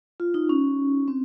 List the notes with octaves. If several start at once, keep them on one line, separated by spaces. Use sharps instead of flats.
F4
D#4
C#4
C4